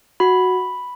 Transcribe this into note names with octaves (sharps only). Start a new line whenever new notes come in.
F#4 B5